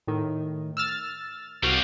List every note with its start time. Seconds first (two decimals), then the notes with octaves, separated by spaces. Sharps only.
0.07 A2 D#3
0.77 E6 F6 A6
1.63 C2 G3 F#4 F5